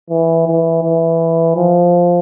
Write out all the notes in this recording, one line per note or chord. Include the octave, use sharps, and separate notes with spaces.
E3
E3
E3
F3